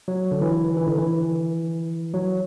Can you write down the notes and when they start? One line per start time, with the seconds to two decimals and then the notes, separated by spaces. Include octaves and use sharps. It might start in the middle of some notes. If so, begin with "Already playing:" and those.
0.08 F#3
0.32 D3
0.42 E3
0.77 E3
0.87 D3
0.98 E3
2.14 F#3